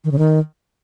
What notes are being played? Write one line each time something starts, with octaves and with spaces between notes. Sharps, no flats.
D#3
C#3
D#3